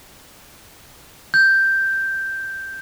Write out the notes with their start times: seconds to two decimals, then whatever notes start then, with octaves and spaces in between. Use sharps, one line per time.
1.34 G6